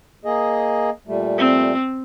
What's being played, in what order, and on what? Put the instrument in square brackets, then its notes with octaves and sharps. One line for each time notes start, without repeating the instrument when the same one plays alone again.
[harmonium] A#3 G#4 D#5
A#2 G3 A3
[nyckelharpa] C4